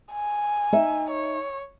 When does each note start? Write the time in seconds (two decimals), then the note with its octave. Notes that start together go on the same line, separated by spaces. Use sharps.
0.12 G#5
0.73 D#4 E5
1.10 C#5